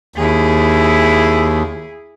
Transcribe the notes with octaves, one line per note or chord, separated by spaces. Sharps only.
D#2 E4 G#4